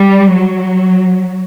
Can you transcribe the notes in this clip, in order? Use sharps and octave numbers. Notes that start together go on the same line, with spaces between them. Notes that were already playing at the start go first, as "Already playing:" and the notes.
Already playing: G3
F#3